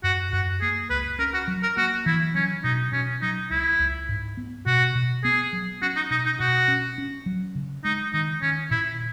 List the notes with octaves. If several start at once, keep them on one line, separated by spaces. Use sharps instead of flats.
F#2 F#4
F#2 F#4
A#3 G#4
C#2 B4
C#4 A#4
F#4
F#3
A#4
A#3 F#4
E3 E4
F#3 C#4
B2 D#4
B2 C#4
F#3 D#4
C#2 E4
C#2
G#2
B3
B2 F#4
B2
B3 G#4
F#3
C#4 F#4
D#4
B2 D#4
D#4
B2 F#4
C#4
C#4
F#3
C#3
G#3 D#4
D#3 D#4
D#3 C#4
A#2 E4